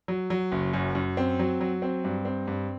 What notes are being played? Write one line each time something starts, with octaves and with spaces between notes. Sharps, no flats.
F#3
F#3
F#1
F#2
F#2
C4
F#3
F#3
C4
G2
C4
G2